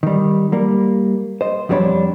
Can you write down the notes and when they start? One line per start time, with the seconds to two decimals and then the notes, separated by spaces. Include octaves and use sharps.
0.03 D#3 G3
0.52 G3 A#3
1.41 C5 D#5
1.69 F2 G3 A3 D4 C#5 B5